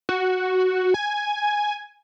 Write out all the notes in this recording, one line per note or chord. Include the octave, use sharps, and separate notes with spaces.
F#4
G#5